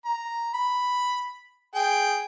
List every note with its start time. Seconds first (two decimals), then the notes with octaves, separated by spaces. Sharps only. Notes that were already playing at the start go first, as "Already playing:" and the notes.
0.05 A#5
0.54 B5
1.75 G#4 G5